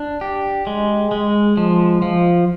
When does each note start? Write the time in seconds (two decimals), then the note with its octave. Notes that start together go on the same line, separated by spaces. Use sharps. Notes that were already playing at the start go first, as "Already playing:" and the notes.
Already playing: D4
0.21 G4
0.67 G#3
1.11 G#3
1.57 F3
2.02 F3